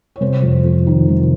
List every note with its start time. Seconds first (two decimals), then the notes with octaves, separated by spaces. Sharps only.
0.16 C#5
0.21 C3 C5
0.42 F2
0.64 F2
0.87 D#3
1.08 C3